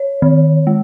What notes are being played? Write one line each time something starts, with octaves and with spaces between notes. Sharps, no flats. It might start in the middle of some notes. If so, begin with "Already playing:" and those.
Already playing: C#5
D#3
G#3